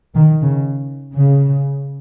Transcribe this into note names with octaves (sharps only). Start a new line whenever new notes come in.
D#3
C#3
C#3